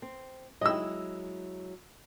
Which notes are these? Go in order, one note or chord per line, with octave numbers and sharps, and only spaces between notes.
C4
F#3 G#3 E4 D#5 E6